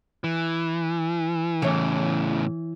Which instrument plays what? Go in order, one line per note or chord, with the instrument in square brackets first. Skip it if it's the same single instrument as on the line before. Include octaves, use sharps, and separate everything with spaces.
[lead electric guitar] E3
[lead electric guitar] A2 C#3 [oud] E3 C#5